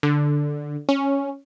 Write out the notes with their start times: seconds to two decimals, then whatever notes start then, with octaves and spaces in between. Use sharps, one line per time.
0.03 D3
0.89 C#4